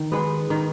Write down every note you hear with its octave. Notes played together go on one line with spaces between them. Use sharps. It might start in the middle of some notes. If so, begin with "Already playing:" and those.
Already playing: D#3
G#3 B3
D#3